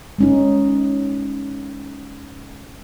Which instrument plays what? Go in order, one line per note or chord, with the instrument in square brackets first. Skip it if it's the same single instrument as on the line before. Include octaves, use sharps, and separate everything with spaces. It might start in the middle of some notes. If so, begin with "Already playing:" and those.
[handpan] G#3 C#4 D#4